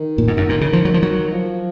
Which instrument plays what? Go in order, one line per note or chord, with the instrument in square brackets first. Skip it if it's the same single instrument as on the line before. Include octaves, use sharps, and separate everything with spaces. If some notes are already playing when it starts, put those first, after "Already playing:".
Already playing: [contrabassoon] D#3
[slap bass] A#2
G#2
F#2
A#2
C#3
F3
F#3
F3
F#3
[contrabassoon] F3